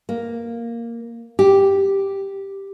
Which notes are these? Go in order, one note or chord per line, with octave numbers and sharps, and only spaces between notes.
A#3
G4